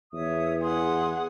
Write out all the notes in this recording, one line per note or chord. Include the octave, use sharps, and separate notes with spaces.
E2 C#5 E5 D#6
G#4 F#5 C6 D#6